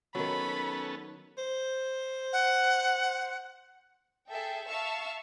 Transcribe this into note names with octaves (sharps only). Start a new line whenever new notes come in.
D#3 F#3 B3 C#4 A4 B5
C5
F#5
G#4 A4 E5 G5
E5 F5 A5 C#6 E6 F6